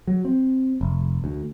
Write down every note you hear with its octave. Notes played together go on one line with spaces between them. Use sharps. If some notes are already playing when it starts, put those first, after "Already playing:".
F#3
C4
F1
D2